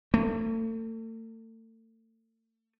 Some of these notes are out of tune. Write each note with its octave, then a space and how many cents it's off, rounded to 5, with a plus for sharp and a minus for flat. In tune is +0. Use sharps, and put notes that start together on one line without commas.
A3 +40